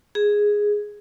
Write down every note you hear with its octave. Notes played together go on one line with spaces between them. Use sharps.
G#4